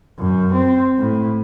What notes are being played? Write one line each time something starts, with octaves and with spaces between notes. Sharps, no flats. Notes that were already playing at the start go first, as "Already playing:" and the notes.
F#2
C4
A2